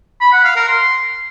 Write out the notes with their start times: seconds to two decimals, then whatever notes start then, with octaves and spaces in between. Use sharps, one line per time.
0.21 B5
0.33 F#5
0.45 F5
0.56 A#4
0.68 C6